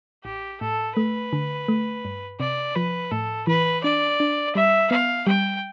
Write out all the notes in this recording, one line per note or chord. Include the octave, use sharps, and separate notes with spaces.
A1 G4
A2 A4
A3 B4
D3
A3
G2
C3 D5
F3 B4
A2 A4
E3 B4
D4 D5
D4
G3 E5
B3 F5
G3 G5